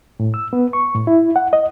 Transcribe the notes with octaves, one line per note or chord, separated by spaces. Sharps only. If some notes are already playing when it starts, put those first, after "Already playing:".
A2
E6
B3
C#6
A2
E4
F#5
D#5